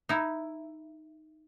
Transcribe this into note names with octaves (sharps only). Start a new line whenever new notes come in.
D#4 E4